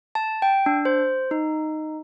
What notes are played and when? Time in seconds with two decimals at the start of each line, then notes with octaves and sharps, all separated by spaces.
0.15 A5
0.42 G5
0.66 D4
0.85 C5
1.31 D#4